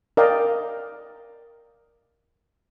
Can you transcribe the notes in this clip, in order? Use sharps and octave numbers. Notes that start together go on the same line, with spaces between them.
A#4 D5 D#5 F5 G5